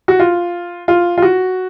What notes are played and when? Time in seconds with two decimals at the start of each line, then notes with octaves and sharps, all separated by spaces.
0.08 F#4
0.19 F4
0.88 F4
1.18 F4
1.22 F#4